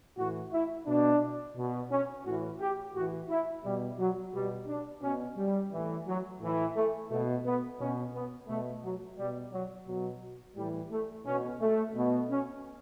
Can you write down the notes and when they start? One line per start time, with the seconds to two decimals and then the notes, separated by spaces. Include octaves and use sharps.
0.17 A2 E3 F#4
0.52 E4
0.86 B2 D4
1.56 B2
1.91 C#4
2.25 A2 E3 F#4
2.60 G4
2.95 A2 E3 F#4
3.29 E4
3.64 B2 G3
3.98 F#3
4.33 B2 G3
4.68 D4
5.02 B2 C#4
5.37 G3
5.72 A2 E3
6.06 F#3
6.40 A2 E3
6.76 A3
7.10 B2 A3
7.45 B3
7.80 B2 C#4
8.14 B3
8.49 B2 A3
8.83 F#3
9.18 B2 G3
9.52 F#3
9.87 B2 F#3
10.56 A2 E3 G3
10.91 A3
11.26 B2 C#4
11.61 A3
11.95 B2
12.30 C#4